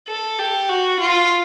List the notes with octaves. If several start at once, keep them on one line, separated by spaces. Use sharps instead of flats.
A4
G4
F#4
F4